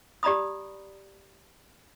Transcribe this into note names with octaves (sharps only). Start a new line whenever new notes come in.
G4 D5 A#5 B5 D#6